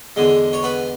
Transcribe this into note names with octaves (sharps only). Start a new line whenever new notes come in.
E2 D3 G#3
C#5
B3 B4